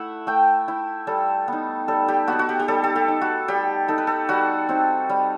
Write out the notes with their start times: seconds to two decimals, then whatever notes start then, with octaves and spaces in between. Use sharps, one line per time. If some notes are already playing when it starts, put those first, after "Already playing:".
Already playing: A3 E4 E5 F#5
0.27 A3 G5
0.68 E4
1.07 G3 A4
1.48 B3 D#4
1.88 G3 A4
2.08 G4
2.28 B3 D#4 F#4
2.39 F#4
2.49 G4
2.59 G4
2.68 G3 A4
2.83 A4
2.96 G4
3.08 D#4
3.21 F#4
3.48 G3 G4
3.88 D#4 A4
3.98 B4
4.07 A4
4.29 G3 F#4
4.69 C4 D#4
5.09 G3